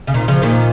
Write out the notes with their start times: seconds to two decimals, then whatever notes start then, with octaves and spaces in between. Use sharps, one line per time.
0.07 C#3
0.14 A#2 D#3
0.28 C#3 F3
0.42 A#2 D#3